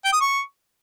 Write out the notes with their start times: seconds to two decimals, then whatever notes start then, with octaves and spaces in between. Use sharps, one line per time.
0.05 G5
0.13 D#6
0.21 C#6